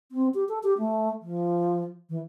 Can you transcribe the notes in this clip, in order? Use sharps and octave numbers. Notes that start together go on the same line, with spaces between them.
C4
G4
A4
G4
A3
F3
E3